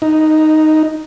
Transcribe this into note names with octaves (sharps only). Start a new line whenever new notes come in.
D#4